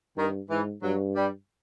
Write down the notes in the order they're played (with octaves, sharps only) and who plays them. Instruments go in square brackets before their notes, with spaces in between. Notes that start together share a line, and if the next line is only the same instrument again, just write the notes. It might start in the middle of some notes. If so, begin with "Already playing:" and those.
[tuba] G2 [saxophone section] D#3
[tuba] G#2 [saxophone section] E3
[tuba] G2 [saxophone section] F#3
[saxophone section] G3